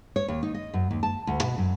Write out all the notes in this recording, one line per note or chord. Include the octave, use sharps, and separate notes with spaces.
C#5
D#2
D#4
D#5
F#2
D#2
A5
D2
B2
F#2